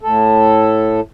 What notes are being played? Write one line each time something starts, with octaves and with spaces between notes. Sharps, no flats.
A2 A4